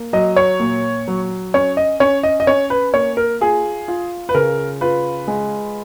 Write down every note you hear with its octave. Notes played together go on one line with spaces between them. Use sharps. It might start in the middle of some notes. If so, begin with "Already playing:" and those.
Already playing: A#3
F#3 D#5
C#5
A#2
F#3
C#4 C#5
D#5
C#4 C#5
D#5
D#5
C#4 C#5
B4
A#3 C#5
A#4
F4 G#4
F4
B4
C#3 A#4
F4 B4
G#3